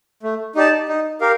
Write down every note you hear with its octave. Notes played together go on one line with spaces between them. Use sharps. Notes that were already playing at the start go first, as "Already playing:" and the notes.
A3
D#4 G4 D5 A5
D#4
G4 A#4 F5